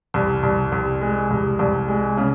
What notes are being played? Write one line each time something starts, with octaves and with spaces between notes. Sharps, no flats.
C2
C2
C2
G#3
C2
C2
G#3
C#3